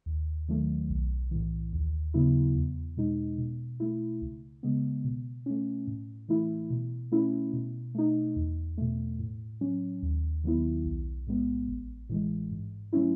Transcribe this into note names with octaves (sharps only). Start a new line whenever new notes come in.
D#2
D#3 F#3 A3
B1
A2 E3
D#2
C#3 F#3 B3 E4
E2
B2 G#3 D#4
B2
A3 E4
C#2
C#3 G#3 B3
B2
A3 C#4
A2
E3 A3 E4
B2
A3 C#4 E4
B2
A3 D#4
E2
B2 A3
A2
F#3 C#4
D#2
D#3 F#3 B3 E4
B1
A2 G#3 B3
A1
A2 E3 G#3
G#2
F#3 A3 C#4 E4